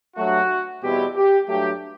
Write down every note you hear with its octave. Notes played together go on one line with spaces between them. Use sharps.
G2 F#3 A3 F#4
E2 B2 G3 C4 E4 G4
G4
G2 F#3 A3 G4